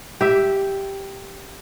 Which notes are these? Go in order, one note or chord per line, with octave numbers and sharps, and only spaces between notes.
G4 E5